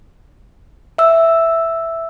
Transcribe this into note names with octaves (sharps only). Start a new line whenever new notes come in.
E5 E6